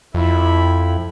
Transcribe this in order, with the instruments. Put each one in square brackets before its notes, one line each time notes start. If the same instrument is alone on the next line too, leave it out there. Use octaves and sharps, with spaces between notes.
[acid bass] F2 [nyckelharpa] E4 B5